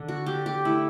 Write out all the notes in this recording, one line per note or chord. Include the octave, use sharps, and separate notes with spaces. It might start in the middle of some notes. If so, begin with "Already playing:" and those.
Already playing: D3
F#4
D3 G4
G4
A3 E4